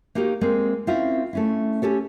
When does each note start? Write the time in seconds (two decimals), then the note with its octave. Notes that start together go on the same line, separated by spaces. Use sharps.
0.15 A#3 D#4 F#4 G4
0.41 G#3 A#3 C4
0.87 C4 C#4 E4 F4
1.33 A3 C#4 E4
1.82 C#4 G4 A4 C#5